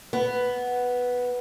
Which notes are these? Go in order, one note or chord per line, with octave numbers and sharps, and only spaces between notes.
B3